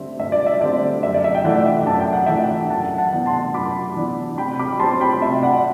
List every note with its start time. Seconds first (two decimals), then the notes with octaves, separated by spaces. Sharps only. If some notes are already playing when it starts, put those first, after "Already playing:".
Already playing: G2 D3 G3 C4 E5
0.19 G2 E5
0.32 D5
0.46 E5
0.61 D3 G3 C4 D5
1.03 F#2 E5
1.14 D5
1.24 E5
1.35 G5
1.44 E3 A3 D4 D5 F#5
1.66 E5
1.86 F#2 A5
2.00 G5
2.13 F#5
2.26 E3 A3 D4 E5 G5
2.70 F#2 F#5 A5
2.98 F#5 A5
3.12 E3 B3 D4
3.26 A5 C6
3.54 F#2 B5 D6
3.96 E3 B3 D4
4.38 C3 G5 B5
4.59 B5 D6
4.79 G3 C4 A5 C6
4.94 C6
5.01 G5 B5
5.21 C3 E5
5.42 D5 F#5